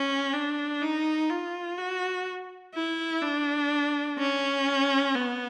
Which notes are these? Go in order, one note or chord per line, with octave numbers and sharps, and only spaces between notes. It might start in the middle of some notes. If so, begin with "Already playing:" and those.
Already playing: C#4
D4
D#4
F4
F#4
E4
D4
C#4
B3